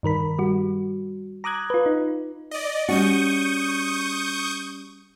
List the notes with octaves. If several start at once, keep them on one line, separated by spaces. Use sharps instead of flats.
G2 D#3 A#4 B5
G3 F#4
A#5 D6 D#6 F#6 G#6
F4 B4
D#4
D5 D#5
G3 C#4 F#4 C#6 D#6 G6